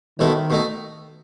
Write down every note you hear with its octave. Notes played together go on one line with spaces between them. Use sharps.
B1 B2 D#3 A3 E4
B2 A3 D#4